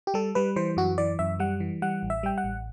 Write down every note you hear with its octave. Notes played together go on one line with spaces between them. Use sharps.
G4
G3 A4
G3 B4
E3 C5
F#2 F#4
E3 D5
F#2 E5
G3 F#5
E3
G3 F#5
A1
E5
G3 G5
F#5
A1